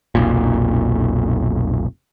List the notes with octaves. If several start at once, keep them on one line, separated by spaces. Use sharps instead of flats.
F1 B1 A#2